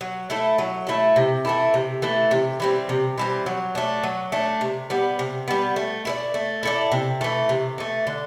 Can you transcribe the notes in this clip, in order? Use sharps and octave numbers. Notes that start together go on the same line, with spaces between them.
F#3
A3 E4 A4
F#3
A3 E4 A4
C3
E3 A3 E4
C3
E3 A3 E4
C3
E3 G3 C4
C3
E3 G3 C4
F#3
A3 D4
F#3
A3 D4
C3
G3 B3
C3
G3 B3
A3
E4 A4 D5
A3
E4 A4 D5
C3
E3 A3
C3
E3 A3
D3